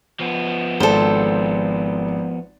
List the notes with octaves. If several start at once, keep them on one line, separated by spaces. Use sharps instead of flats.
F3 B3
G#1 A4 C5